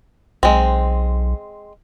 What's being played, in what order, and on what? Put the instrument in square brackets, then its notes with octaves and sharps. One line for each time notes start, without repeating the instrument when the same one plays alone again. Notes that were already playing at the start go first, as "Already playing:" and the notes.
[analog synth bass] B1 [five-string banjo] G#3 C4